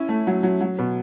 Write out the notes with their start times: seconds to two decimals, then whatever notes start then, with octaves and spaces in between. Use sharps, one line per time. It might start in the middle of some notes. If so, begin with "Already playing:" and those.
Already playing: C#4 E4
0.09 A3
0.27 F#3
0.43 F#3
0.61 F#3
0.79 B2